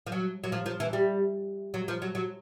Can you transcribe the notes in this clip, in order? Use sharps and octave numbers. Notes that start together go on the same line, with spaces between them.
F3
F#3
F#3
F3
F3
E3
G3
F#3
F3
F#3
F#3